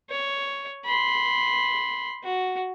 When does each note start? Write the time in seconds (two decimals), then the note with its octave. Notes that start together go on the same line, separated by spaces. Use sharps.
0.10 C#5
0.85 B5 C6
2.23 F#4